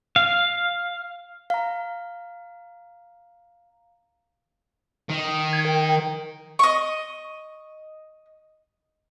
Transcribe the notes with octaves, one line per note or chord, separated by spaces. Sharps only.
F5
F5 A#5
D#3
G#6
A#4 G5
D#5 C#6